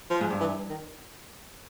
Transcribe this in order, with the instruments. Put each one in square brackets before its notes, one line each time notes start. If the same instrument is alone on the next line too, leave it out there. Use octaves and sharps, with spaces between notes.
[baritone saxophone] F3
[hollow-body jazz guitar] G#2
G2
[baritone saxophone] E3
D#3